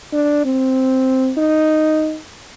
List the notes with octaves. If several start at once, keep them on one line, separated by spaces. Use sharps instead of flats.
D4
C4
D#4